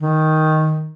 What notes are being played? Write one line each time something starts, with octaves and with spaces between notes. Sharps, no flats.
D#3